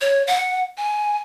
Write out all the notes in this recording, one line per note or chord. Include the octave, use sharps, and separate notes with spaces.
C#5
F#5
G#5